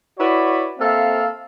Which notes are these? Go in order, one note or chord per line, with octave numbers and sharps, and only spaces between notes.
E4 F#4 B4 C#5 D5
A#3 C4 A4 E5 F5